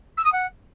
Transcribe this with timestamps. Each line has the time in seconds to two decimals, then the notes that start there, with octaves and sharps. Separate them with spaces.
0.17 E6
0.25 D#6
0.32 F#5